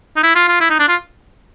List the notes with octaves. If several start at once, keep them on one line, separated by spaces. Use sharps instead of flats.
D#4
E4
F4
F4
E4
D#4
D4
F4